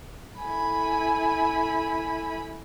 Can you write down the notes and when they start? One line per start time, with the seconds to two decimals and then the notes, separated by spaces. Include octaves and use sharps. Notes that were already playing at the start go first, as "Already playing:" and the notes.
0.41 E4 A4 G#5 B5